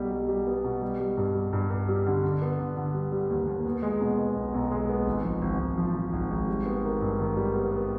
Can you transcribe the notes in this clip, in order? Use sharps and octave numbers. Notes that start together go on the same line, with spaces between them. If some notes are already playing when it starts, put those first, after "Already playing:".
Already playing: B1 B2 G3
G3
G3
B3
B2
G3
G3
G2
G3
G2
G2
G3
D3
D3
B3
D3
D3
G3
G3
D#2
D#2
B3
G#3
B2
B3
B1
B1
G#3
B3
G#1
F3
G#1
G#1
F3
F3
G#1
G#1
G3
B3
D#3
G2
D#3
G3
B3
B3